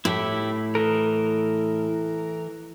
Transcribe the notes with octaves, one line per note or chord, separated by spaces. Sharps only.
A2 E4 G4 E5
E3 A4 A#4